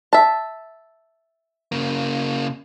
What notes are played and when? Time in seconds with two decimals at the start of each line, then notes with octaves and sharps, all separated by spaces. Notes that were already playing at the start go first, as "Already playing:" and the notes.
0.13 E5 A5
1.72 C#3 A#3